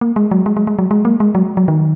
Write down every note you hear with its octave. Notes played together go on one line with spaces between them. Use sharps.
A#3
G#3
F#3
G#3
G#3
G#3
F#3
G#3
A#3
G#3
F#3
F#3
D#3